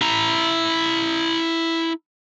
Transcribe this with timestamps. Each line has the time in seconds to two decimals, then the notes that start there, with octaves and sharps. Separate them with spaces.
0.01 E4 A#5